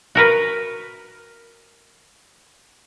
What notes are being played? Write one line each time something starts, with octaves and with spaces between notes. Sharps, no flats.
F#4 A#4 B4